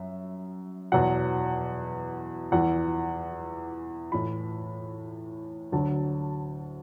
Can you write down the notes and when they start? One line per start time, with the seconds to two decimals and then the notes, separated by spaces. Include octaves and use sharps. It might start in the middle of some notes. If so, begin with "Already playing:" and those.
Already playing: F#2 E5
0.92 E2 B2 F#3 F#5
2.52 E2 E3 F#5
4.12 A2 E3 B5
5.72 D2 D3 F#3 A5